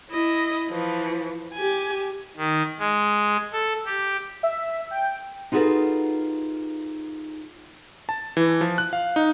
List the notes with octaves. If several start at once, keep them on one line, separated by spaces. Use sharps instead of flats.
E4 D#5
E3 F3
G4 G#5
D#3
G#3
A4
G4
E5
G5
D#4 F4 F#4 G#4 A4 B4
A5
E3
F3
F#6
F5
D#4